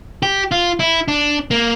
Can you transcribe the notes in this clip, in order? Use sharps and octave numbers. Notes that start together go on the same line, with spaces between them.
G4
F4
E4
D4
A#3